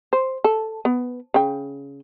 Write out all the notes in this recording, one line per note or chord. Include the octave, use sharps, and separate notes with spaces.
C5
A4
B3
C#3 G5